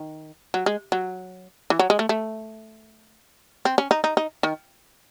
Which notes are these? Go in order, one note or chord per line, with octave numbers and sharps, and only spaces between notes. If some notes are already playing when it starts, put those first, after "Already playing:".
Already playing: D#3
F#3
G#3
F#3
E3
F#3
G#3
A3
A3
C4
C#4
D#4
D#4
D#4
D#3